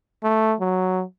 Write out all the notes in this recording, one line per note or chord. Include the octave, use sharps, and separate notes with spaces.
A3
F#3